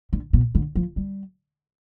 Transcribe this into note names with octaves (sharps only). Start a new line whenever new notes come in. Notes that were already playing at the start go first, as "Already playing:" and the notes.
D3
B2
D3
F3
G3